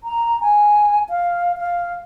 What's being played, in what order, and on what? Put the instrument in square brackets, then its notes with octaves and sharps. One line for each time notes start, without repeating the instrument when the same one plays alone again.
[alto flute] A#5
G#5
F5
F5